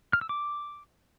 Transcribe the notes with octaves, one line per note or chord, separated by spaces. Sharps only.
F6
E6
D6